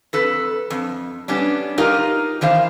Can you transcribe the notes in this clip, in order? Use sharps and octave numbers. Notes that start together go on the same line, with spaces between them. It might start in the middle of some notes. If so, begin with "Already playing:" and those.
F2 A4 B4
F2
G3 B3 C#4 D4
D#4 F4 G4 A#4 D#5
D#3 E3 C5 F5